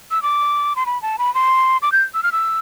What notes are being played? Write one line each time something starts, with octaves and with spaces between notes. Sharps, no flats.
E6
D6
C6
B5
A5
B5
C6
D6
G6
E6
F6
E6